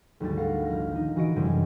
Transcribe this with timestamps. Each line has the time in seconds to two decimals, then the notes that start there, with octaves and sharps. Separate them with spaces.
0.20 G#1 D2 G3 A6
0.37 A#4 F5 F#5
0.65 A#1 F6 A#6
0.91 D#3 D#4
1.16 E3 F#4 D#5 D7
1.36 F#2 C3 E3 G3 G#3 D4